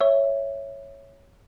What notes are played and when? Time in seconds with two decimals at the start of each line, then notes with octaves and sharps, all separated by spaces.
0.01 C#5 E5